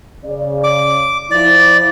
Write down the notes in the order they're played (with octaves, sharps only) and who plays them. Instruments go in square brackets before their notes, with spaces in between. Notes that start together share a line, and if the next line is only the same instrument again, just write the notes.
[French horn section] C#3 D5
[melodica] D6
[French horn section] F3 E4 [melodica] D5